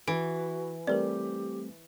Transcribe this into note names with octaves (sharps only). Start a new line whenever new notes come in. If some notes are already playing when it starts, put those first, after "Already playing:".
E3 F#4 D7
G3 A3 C4 G4 A#4 B4 D5